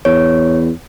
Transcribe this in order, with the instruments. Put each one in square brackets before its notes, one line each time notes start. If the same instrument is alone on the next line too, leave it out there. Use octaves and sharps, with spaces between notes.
[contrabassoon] E2 [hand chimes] C#5